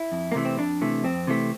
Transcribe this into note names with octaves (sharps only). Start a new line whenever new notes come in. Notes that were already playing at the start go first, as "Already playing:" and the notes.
Already playing: E4
F2
A#3
C3 E3 A3
C4
F2 D4
C3 E3 A3
F2 C4
C3 E3 A3